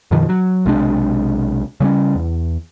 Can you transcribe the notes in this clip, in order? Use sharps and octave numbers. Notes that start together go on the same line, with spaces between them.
F#2 B2 D#3 F3
F#3
B1 C3 G#3 D4
C#3 G3 B3 C#4
E2